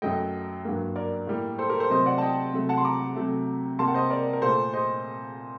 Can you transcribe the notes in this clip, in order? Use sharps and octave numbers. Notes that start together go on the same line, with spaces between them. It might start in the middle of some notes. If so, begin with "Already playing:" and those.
F#2 F#3 A3 D#5 G5
G2 F#3 A#3
A#4 D5
A2 G3 A#3
A4 C5
G4 A#4
A4 C5
C3 F#3 A3 C5 D#5
D5 F#5
A5
D#5 G5
C3 F#3 A3
F#5 A5
C6
A#5 D6
C3 F#3 A3
C3 G3 A#3 A5 C6
F#5
C5 D#5
A#4 D5
A#4
A#2 A3 A4 C5
C5 D#5